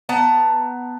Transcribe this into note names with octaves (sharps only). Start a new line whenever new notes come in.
B3 A5 A#5